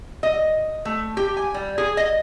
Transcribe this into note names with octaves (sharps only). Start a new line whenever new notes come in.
D#5
A3
G4
G#5
G3
G#4
D#5